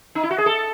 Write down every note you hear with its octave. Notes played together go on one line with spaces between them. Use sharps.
D#4
E4
F#4
G#4
A4